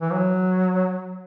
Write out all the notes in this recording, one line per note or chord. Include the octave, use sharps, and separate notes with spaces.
E3
F#3